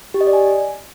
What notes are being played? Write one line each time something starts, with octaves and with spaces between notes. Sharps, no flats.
G4
D#5
D5
G#5